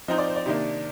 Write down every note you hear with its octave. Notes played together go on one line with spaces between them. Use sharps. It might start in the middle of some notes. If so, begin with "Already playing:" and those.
F3 C4 D#4 C5 D#5
D5
C5
D5
C3 D#3 A#3 D4